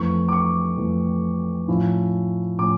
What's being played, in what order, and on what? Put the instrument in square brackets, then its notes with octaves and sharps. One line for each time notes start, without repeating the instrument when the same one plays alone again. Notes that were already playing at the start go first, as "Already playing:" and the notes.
Already playing: [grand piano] F2 E3 A3 C#6
D6
C#6
F2 E3 A3
A2 F3 C#4 E4
A2 F3 C#4 D6